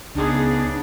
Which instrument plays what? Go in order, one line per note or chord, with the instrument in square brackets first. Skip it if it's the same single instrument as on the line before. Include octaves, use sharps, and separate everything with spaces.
[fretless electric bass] C#2 [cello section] C#3 B3 [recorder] D4 [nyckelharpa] D#4 G#4